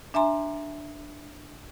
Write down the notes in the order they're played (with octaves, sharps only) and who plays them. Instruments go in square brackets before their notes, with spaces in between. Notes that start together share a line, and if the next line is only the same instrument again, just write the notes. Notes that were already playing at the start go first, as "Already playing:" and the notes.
[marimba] D4 E5 G#5 A#5 C6